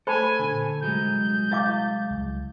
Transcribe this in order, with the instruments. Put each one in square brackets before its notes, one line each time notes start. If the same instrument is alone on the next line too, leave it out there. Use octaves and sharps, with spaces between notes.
[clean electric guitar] A3 A4 [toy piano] C5 B5 [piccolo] G#5
[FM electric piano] A#2 D3
[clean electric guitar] C2 F#3 G#3 [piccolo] G6
[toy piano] E4 F5 D6 [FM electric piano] A6
[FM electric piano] C#2